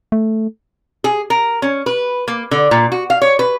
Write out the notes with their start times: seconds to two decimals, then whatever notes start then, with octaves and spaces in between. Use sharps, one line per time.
0.12 A3
1.04 G#4
1.30 A#4
1.62 C#4
1.86 B4
2.28 A#3
2.51 D3
2.71 A#2
2.92 F#4
3.10 F5
3.22 C#5
3.39 B4